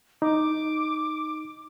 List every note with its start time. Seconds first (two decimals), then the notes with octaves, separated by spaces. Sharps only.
0.22 D#4 D6